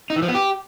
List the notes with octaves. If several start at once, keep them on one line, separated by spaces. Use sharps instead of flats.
D#4
E3
F3
B3
G4